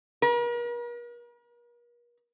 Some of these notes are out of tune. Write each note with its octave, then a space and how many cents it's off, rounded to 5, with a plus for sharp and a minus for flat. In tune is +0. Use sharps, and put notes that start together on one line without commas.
A#4 +45